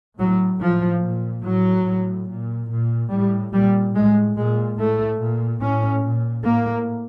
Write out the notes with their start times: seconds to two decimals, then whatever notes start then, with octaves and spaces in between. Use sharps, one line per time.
0.19 A2 F#3
0.61 A2 F3
1.03 A#2
1.44 A2 F#3
1.86 A2
2.28 A#2
2.70 A#2
3.11 A2 G3
3.53 A#2 G3
3.95 A2 G#3
4.36 A#2 G#3
4.78 A2 A3
5.20 A#2
5.61 A2 C#4
6.03 A#2
6.45 A2 A#3